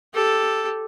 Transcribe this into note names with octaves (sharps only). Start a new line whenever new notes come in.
G4 A4